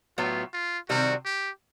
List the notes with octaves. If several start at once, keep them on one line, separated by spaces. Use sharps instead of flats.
A2 F#3 B3 F4
F4
C3 D#3 G3 C4 F#4
G4